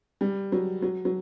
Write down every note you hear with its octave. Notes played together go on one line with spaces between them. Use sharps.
G3
F#3
F#3
F#3